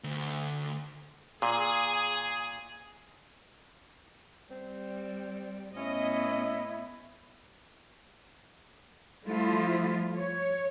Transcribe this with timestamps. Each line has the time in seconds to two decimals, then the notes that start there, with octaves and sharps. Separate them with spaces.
0.04 D2
1.42 A#2 G#4
4.51 G3 C4
5.77 A2 B3 C#4 E4 D#5
9.26 F3 G3 A3 E4 F4
10.15 C#5